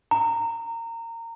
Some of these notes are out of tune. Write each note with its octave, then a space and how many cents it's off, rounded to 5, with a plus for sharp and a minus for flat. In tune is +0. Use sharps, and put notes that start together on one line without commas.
A#5 -20